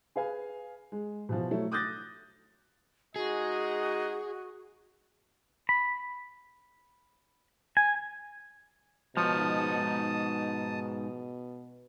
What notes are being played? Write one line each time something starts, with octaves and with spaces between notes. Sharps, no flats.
G#4 B4 F5 G#5
G#3
B2 E3 F3
F#3 A3 E4
D6 D#6 F#6 G6 A6 A#6
G#3 D#4 F#4 G#4 D#5
B5
G#5
G#2 B2 F3 D#4 C#5 A5 D#6